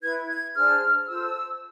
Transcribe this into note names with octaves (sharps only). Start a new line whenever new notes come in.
E4 B4 G#6
G#6
D4 G#4 C5 F6
F4 A4 C5 E6